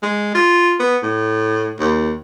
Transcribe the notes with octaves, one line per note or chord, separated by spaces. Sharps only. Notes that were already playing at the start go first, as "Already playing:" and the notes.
G#3
F4
B3
A2
D#2